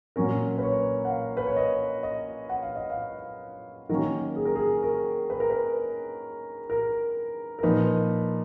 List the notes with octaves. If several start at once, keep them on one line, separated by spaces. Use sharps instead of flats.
A#2 F#3 C#4 A#4
B4
C#5
F#5
F5
B4
C#5
D#5
D#5
F#5
F5
D#5
F5
D#3 F#3 A#3 C#4 A#4
G#4
A#4
G#4
A#4
B4
A#4
B4
A#4
A#4
A#2 F3 A#3 D#4 B4